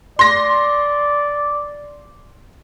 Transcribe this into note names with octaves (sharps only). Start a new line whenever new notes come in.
D5 C6 A#6